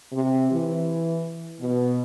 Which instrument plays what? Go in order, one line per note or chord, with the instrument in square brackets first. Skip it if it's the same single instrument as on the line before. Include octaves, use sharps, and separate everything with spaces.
[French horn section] C3
E3
B2